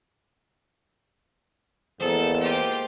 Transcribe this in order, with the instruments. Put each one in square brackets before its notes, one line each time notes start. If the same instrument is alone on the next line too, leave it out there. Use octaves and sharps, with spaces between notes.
[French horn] E2 [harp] G#3 A#3 [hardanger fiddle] A4 [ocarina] C5
[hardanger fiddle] F4 G4